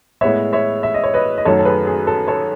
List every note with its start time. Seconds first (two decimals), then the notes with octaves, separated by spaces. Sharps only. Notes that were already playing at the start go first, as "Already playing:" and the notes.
0.21 A2 G#3 B3 C#5 E5
0.53 C#5 E5
0.83 E5
0.94 D#5
1.03 C#5
1.14 B4 D#5
1.38 D#5
1.45 F#2 D#3 F#3 A3 C#4 A4 C#5
1.59 A4
1.65 G#4 B4
1.87 G#4
2.07 A4
2.28 A4 C#5